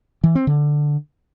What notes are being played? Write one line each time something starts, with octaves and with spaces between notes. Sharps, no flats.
E3
C4
D3